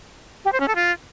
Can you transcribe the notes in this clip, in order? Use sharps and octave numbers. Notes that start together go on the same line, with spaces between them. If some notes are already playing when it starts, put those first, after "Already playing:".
G4
C5
C#4
A4
F4